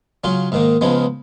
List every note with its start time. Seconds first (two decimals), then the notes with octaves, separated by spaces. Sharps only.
0.24 C#3 F#3 C#4 F4
0.52 G#2 D#3 A#3
0.81 C#2 C#3 F3 G#3 B3